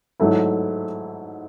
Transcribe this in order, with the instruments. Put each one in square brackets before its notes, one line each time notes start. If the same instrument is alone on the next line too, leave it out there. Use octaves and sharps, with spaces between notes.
[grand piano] G#2 F#3 A3 E4